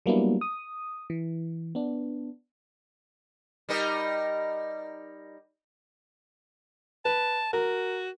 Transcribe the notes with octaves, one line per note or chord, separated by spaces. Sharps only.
F#3 G3 A#3 B3 D4 E4
D#6
E3
B3 D4
G3 D#4 A#4
B4 A5
F#4 A#4